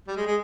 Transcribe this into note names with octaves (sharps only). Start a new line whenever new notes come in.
G3
G#3
G#3